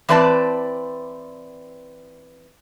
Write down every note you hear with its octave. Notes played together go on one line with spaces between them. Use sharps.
E3 C4 B4 D5 A5